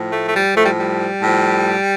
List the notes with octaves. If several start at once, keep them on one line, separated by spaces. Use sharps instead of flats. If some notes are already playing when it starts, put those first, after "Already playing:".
Already playing: A2 F3
A3
A3
G3
A2 F3 A3
G3
G3
A2 F3